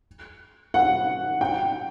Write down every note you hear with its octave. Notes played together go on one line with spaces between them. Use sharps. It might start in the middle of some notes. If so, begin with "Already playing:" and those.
F#5
G5